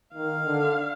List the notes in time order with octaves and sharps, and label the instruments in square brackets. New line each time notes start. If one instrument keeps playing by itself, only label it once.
[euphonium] D#3 [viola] F5
[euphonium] D3